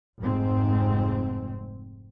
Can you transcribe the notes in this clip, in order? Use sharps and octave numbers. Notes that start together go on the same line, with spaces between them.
F1 G#2 C4